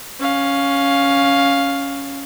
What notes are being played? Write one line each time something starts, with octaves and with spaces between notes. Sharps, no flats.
C#4 F5